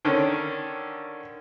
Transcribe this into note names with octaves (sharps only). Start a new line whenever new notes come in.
D3 D#3 C#4